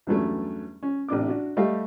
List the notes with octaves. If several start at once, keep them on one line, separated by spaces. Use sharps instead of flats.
E2 G2 F#3 G3 A3 C#4
C#4
A1 C3 D4 D6
D4 F#4
G3 A3 G4 D#5 F5